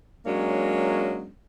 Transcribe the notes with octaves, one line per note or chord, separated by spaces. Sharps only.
F#3 G#3 A#3 C#4 D4 C#5